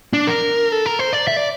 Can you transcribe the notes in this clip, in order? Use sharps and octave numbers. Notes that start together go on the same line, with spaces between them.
D4
A#4
A4
A#4
C5
D5
E5
D5